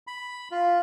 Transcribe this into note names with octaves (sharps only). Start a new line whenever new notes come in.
B5
F4